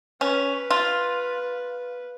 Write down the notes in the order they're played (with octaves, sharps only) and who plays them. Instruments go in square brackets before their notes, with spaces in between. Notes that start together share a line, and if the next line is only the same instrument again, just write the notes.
[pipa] C#4 [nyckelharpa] B4
[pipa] F4